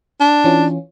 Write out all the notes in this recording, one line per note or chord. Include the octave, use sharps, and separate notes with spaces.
D4
E3 C#4 F4